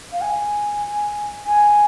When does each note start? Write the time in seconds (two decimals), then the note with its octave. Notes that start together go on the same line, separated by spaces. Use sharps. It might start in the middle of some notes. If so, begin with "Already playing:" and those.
0.12 F5
0.22 G#5
1.46 G#5